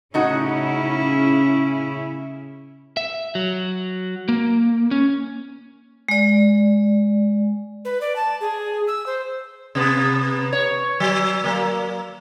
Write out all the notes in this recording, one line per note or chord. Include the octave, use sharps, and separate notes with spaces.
A2 C#3 C#4 D#4 E4 F#4
E5
F#3
A#3
C#4
G#3 D5
B4
D5
A5
G#4
E6
C5
C3 B3
C#5
F#3
F#3 A#3